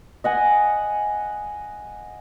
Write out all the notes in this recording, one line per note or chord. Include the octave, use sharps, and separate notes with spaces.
D#5 F#5 G#5